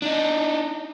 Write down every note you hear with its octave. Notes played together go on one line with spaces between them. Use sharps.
D4 D#4